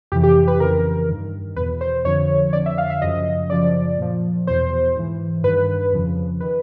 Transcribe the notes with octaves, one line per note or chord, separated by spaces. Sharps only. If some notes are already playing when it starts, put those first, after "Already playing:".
F2 C3 E3 G4
G4
B4
F2 C#3 E3 A#4
G2 D#3
E2 B2 B4
C5
F2 D3 F3 C#5
F2 D3 F3 D5
E5
F5
E5
F#2 C#3 F3 D#5
F#2 C#3 F3 D5
A#2 F3
E2 B2 C5
G#2 E3
G2 D#3 B4
F2 C#3 F3
D#3 B4